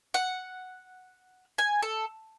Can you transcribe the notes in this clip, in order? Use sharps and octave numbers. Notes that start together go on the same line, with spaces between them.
F#5
G#5
A4